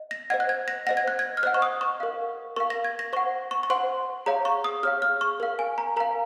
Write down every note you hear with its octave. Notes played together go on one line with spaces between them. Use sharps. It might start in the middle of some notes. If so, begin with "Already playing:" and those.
Already playing: D#5
A#6
C5 D#5 F#5 G#6
F#6
G#6
A#6
C5 D#5 F#5 A#6
G#6
F#6
G#6
F6
C5 D#5 F#5 F#6
C#6
D#6
C#6
A#4 F5
A#4 F5 C#6
A#6
G#6
A#6
C5 F#5 C#6
C#6
C#6
C5 F#5 C6
G#4 C#5 F5 A#5
C#6
D#6
G#4 C#5 F5 F6
F6
C#6
A#4 F5
G#5
A#5
A#4 F5 A#5